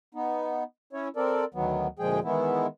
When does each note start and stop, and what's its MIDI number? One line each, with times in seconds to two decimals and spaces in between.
0.15 0.64 59
0.15 0.64 63
0.93 1.08 61
0.93 1.08 64
0.93 1.08 73
1.16 1.45 60
1.16 1.45 69
1.16 1.45 70
1.16 1.45 74
1.54 1.87 38
1.54 1.87 51
1.54 1.87 54
1.54 1.87 59
1.99 2.20 38
1.99 2.20 46
1.99 2.20 53
1.99 2.20 56
1.99 2.20 68
1.99 2.20 79
2.24 2.67 51
2.24 2.67 52
2.24 2.67 56
2.24 2.67 59
2.24 2.67 64